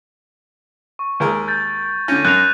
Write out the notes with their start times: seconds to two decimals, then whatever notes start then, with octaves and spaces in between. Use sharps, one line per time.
0.99 C#6
1.20 D#2 G#3 A#4
1.48 G6 A6
2.08 D3 C#4 G6 A#6 D#7
2.25 F#2 F#6 A#6 F7